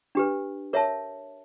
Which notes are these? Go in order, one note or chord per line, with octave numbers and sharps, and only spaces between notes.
D4 G4 B4
A#4 C#5 E5 A5